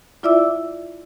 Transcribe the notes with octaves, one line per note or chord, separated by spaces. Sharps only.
E4 F4 D5 E5 D6 E6